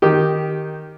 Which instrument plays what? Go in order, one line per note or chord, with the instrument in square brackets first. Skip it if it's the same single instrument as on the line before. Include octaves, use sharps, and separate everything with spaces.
[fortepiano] D#3 G4